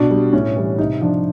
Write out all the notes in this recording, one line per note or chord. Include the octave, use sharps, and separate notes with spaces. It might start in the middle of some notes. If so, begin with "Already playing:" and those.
Already playing: B2 D4
G3
A2 C#4
E3 G3
C3 D#4
F3 D4